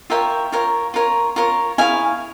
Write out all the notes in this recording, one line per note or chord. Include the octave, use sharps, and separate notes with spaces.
F4 A#4 C#5 E5 G5
F4 A#4 C#5
F4 A#4 C#5
F4 A#4 C#5
E4 G#4 C#5 F5 G#5